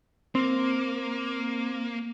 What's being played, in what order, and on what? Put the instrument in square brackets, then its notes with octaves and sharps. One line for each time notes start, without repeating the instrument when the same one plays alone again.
[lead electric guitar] A#3 [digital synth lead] C4